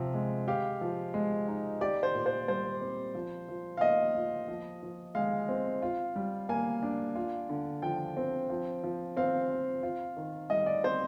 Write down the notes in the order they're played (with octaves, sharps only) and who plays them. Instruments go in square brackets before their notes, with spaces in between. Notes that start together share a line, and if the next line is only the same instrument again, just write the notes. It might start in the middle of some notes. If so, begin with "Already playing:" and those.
Already playing: [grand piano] C3 F3
G#3
[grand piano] G4 [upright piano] F5
[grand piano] F3
G#3
D#4
[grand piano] G4 [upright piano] D5
[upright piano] C5
[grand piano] A#2
[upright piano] C5
[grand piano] G3 [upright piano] C5
[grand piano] C4
F3
F3
[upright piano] F5
[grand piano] A#3 [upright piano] D#5
[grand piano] F4
F3
F3
[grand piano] G#3 [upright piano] F5
[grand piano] C4
F4
G3
[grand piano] A#3 [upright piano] G#5
[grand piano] D4
F4
D3
[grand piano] F3 [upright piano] G5
[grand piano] C4
F3
F3
[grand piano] C4 [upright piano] F5
[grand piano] F4
F4
D#3
[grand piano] G3 [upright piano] D#5
[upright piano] D5
[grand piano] C4 [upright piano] C5